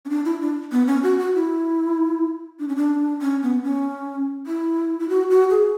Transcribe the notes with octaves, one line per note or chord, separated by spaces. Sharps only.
C#4
D4
E4
D4
B3
C#4
F#4
F#4
E4
D4
C#4
D4
C#4
B3
C#4
E4
E4
F#4
F#4
G#4